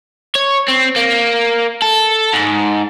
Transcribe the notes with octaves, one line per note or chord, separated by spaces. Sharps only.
C#5
C4
A#3
A4
G#2